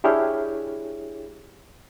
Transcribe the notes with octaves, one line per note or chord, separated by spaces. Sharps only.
D4 E4 G4 G#4 C#5 F6